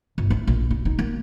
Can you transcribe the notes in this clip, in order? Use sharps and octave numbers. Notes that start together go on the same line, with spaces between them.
G1
E4
A#1
E4
D#4
A#3